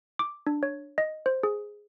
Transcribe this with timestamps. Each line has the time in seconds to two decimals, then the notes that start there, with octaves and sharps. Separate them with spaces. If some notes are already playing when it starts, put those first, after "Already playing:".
0.19 D6
0.47 D4
0.63 C#5
0.98 D#5
1.26 C5
1.43 G#4